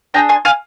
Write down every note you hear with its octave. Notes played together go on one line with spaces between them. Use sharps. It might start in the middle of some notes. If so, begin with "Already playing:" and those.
D4 G#4 G5 A#5
G#5 C6
F5 G#5